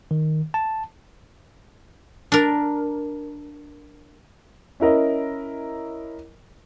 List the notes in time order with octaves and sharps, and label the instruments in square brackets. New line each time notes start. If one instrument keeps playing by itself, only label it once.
[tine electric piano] D#3
A5
[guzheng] D4 A#4
[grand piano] C#4 E4 A#4 D#5